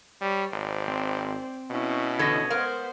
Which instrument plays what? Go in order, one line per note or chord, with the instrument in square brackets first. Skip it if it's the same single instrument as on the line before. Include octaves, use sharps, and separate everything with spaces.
[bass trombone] G3 [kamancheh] C#5
[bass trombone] G#1 [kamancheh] C5 D5
[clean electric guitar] C4
[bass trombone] B2 [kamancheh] C#4 E4
[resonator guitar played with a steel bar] D3 E3 A4 [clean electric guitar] C#5 D#5
[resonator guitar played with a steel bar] G#3 A#4 F5 [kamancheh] B3 C5